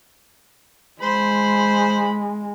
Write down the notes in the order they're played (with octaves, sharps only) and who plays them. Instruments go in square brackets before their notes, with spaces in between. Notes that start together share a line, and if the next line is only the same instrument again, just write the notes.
[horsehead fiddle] G#3 [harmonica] C5 [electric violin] B5